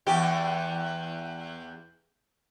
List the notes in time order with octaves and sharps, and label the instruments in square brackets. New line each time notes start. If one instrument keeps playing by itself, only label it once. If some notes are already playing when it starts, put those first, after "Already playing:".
[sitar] E2 G4